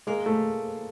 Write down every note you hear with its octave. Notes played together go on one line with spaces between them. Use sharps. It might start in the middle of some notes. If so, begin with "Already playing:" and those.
G#3 A#3
A3